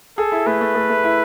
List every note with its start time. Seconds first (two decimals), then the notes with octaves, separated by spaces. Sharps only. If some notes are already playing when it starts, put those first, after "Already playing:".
0.18 G#4 A4
0.32 E4
0.46 A3 B4
0.61 A3
0.75 A3
0.90 A3
1.04 E4